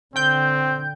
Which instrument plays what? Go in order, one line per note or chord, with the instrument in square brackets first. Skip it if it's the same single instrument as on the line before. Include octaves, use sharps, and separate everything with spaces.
[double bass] D3 [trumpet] C4 [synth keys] G5 G6